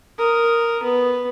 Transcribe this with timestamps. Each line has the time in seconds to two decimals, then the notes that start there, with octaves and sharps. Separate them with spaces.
0.18 A#4 D#6
0.83 B3